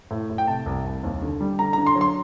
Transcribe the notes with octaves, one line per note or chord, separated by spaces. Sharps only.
A2
A2
G5
C3 A5
C2
C2
D#2
D3
G3
D3 A#5
D3 A#5
C6
F#3
C6